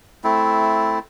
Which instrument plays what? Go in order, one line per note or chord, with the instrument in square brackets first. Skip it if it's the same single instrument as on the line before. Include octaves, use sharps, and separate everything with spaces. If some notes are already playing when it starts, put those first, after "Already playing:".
[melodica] A3 C4 E4